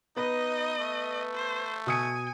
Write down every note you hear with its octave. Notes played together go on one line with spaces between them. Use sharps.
B3 D#4 B4 D#5
A3
C5
B2 G#5 D#6 C#7